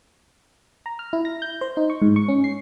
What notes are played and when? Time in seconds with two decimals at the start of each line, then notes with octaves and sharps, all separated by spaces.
0.86 A#5
0.99 F6
1.13 E4
1.25 A#6
1.42 G6
1.61 C5
1.77 D#4
1.90 C#6
2.02 G#2
2.16 C#6
2.28 C#4
2.44 C7